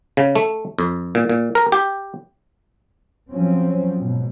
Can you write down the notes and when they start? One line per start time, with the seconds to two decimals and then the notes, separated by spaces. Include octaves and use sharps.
0.17 C#3
0.36 A3
0.79 F2
1.15 A#2
1.29 A#2
1.55 A#4
1.72 G4
3.31 F3 F#3 C4 C#4
3.98 G#2 B2